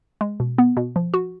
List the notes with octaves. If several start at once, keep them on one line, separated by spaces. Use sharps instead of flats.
G#3
B2
B3
B2
F3
F#4